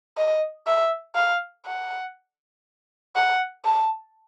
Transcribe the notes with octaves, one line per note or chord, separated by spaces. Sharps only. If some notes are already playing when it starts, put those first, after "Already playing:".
D#5
E5
F5
F#5
F#5
A5